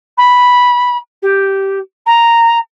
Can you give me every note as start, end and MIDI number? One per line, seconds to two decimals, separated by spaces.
0.17 0.97 83
1.22 1.78 67
2.06 2.58 82